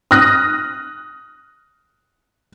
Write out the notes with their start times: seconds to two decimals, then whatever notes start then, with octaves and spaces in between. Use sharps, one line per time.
0.11 D#6 F6 F#6 A#6